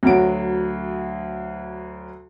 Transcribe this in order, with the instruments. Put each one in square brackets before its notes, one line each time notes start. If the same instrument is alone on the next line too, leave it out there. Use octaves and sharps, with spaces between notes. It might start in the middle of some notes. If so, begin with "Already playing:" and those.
[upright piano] D2 F#3 D7